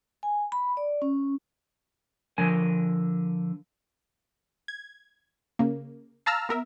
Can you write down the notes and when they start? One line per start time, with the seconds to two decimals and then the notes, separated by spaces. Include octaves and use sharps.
0.23 G#5
0.52 B5
0.77 D5
1.02 C#4
2.38 D3 F3 A#4 G#5
4.68 G#6
5.59 C#3 A#3
6.26 F5 A5 A#5 E6 F6
6.49 B3 A#4 E5